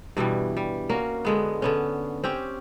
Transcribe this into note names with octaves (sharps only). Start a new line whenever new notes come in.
G2 B2 E3 G3
G3
A#3 C#4 F#4
D3 G#3 B3
D3 B3 C#4
C4 C#4 G4